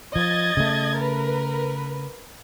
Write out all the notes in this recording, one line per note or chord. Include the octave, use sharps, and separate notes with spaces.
F3 D#5 G#6 A6
C#3 A3
A#4 B4